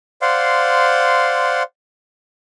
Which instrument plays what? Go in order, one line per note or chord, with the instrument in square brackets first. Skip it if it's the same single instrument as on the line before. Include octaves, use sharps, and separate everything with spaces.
[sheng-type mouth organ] C5 D5 F5 F#5 C6